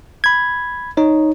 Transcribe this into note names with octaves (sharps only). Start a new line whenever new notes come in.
B5 G#6
D#4 C#5